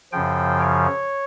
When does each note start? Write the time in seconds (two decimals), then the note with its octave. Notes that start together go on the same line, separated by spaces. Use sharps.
0.12 F#2 C#3 F3 G5
0.59 C#5